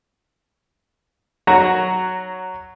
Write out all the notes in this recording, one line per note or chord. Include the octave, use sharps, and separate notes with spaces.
F#3 F#4 A#5